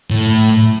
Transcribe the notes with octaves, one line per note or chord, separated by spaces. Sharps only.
A2